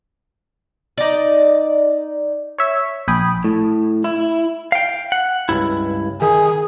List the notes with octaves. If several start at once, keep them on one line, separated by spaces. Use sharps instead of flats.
D#4 D5
C#5 E5
A#1 G5 G#5 B5 D#6
A2
E4
F5 G5
F#5
C#2 G2 E4
D#3 G#4